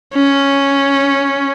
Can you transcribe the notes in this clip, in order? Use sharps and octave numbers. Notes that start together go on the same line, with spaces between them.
C#4